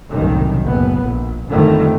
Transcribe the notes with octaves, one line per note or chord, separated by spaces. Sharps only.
F#1 C2 F#2 A2 D#3
F#1 A2 B3
A#1
G#1 F2 D3 D#3 G3 A3